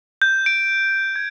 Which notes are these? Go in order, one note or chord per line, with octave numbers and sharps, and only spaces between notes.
G6
D7
G#6